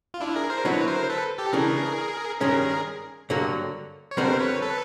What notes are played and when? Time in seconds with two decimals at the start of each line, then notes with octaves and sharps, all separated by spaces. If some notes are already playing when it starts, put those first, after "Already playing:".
0.14 F4
0.20 D4 E4
0.36 G#4 A#4
0.50 A#4 C5
0.65 D3 F#3 B3 E4 B4 C#5
0.87 A#4 C5
1.10 A4 B4
1.38 G4 A4
1.53 C#3 E3 A3 D4 G#4 A#4
2.41 G2 D#3 G#3 C#4 G#4 A#4
3.30 G2 D3 F#3 A#3
4.11 C#5
4.17 F2 D3 G3 B3 A#4 C5
4.39 B4 C#5
4.62 A4 B4